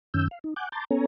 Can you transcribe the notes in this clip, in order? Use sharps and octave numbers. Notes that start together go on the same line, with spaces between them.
F#2 D#3 C#4 E6 G6
F5
D#4
F#5 G#5 D6 F#6 G6
A5 A#5 C6 D6 G6 A6
B3 C#4 A4 C#5 G#5 A#5